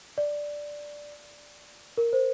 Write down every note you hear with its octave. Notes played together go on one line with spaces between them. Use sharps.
D5
A#4
C5